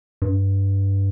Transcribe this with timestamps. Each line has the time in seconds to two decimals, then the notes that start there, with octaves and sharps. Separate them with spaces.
0.22 G2